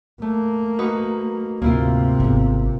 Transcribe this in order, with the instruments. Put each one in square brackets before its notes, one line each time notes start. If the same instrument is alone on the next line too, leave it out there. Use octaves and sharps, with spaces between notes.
[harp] A3 [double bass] A#3
[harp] D#4 F#4 B4
[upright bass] D2 [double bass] G#2 C3 [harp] A#3 E4 F4
[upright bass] G#1 B3